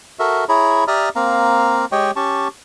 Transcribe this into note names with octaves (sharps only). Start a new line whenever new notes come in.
F#4 A4 A#4 E5
E4 G#4 C#5 A#5 B5
G4 D5 E5 A#5 D#6 F6
A#3 C4 F5 A#5
G#3 G4 C#5 D#5 G5 C#6
C#4 G4 A5 C#6